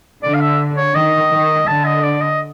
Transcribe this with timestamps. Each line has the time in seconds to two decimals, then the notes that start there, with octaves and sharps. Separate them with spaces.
0.23 D3 D5
0.34 F5
0.41 E5
0.77 C#5
0.95 D#3 D#5
1.32 D#3
1.67 D3 A5
1.85 D#5
2.03 D5
2.21 D#5